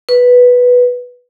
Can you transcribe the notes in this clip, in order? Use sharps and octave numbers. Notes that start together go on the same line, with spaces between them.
B4